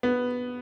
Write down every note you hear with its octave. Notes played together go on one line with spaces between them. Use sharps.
B3